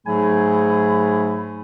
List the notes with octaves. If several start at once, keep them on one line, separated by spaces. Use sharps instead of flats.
G#2 F#3 A3 G#4 G#5 B5